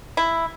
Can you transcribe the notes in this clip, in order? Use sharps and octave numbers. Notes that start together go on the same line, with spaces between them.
E4